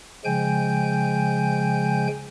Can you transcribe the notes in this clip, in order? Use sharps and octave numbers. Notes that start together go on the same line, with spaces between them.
C#3 F3 G#3 G5 G#5 G6